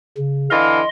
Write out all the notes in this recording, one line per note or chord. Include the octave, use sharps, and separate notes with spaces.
C#3
D3 E3 D#5 F5 C6